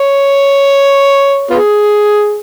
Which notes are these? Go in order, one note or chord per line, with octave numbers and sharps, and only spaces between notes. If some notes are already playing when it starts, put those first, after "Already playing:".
Already playing: C#5
B3 F4 G#4